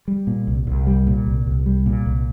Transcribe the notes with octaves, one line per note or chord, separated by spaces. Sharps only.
G3
A#2
C2
C2
G3
A#2
C2
C2
G3
A#2
C2